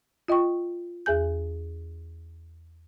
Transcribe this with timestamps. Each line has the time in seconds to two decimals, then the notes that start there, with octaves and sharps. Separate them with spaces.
0.28 F4 D#5 G5 C#6
1.06 E2 G#4 G#5 G6